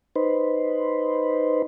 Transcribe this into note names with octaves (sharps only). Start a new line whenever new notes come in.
D#4 B4 C5